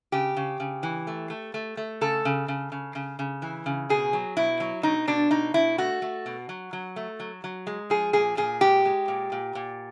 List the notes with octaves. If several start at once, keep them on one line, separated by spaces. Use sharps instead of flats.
C#3 G4
C#3
C#3
E3
A3
A3
A3
A3
C#3 A4
C#3
C#3
C#3
C#3
C#3
E3
C#3
B2 G#4
F#3
B2 E4
F#3
B2 D#4
B2 D4
B2 D#4
B2 E4
A3 F#4
A3
B2
F#3
F#3
A3
F#3
F#3
G#3
F3 G#4
A#2 G#4
A#2 G#4
G#3 G4
G#3
A#2
A#2
A#2